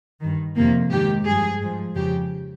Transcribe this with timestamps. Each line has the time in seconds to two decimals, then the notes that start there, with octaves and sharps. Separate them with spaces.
0.21 G2 D#3
0.56 F2 C3 D#3 A#3
0.90 G#2 D#3 G4
1.25 G2 F3 G#4
1.61 G#2 F3
1.95 F2 C#3 F3 G4